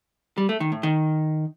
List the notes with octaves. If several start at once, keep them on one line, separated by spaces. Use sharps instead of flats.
G3
A3
D#3
A2
D#3